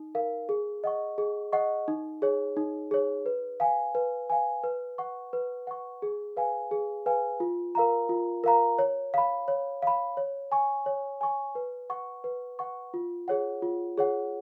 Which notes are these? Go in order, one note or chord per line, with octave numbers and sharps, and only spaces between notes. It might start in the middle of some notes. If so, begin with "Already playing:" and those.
Already playing: D#4
A#4 F5
G#4
D#5 F#5 C#6
G#4
D#5 F#5 C#6
D#4
G#4 C#5
D#4
G#4 C#5
B4
F5 G#5
B4
F5 G#5
B4
F#5 C#6
B4
F#5 C#6
G#4
B4 F5 G#5
G#4
B4 F5 G#5
F4
A#4 F5 A#5
F4
A#4 F5 A#5
C#5
F5 B5
C#5
F5 B5
C#5
G#5 C#6
C#5
G#5 C#6
B4
F#5 C#6
B4
F#5 C#6
F4
G#4 C#5 F#5
F4
G#4 C#5 F#5